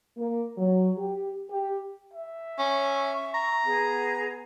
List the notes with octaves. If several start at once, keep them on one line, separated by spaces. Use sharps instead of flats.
A#3
F#3
G4
G4
E5
C#4 C#6
A#5
B3 G#4